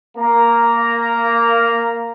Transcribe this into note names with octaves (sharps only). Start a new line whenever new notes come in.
A#3 A#5